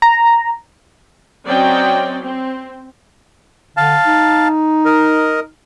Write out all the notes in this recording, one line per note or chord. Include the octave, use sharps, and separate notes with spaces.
A#5
F#3 C4 C#4 D5 D#5 G5
C4
D3 F5 A5
D#4
A#4 D#5